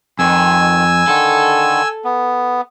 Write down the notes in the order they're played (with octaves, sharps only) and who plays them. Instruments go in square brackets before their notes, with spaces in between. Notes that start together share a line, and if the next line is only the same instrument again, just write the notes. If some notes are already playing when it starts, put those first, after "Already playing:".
[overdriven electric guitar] F2 [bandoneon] D#3 [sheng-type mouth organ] G#5 E6
[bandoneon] D3 D#3 [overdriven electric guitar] A4
[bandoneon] B3